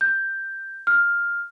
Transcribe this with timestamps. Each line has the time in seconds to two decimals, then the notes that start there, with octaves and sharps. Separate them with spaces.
0.01 G6
0.87 F6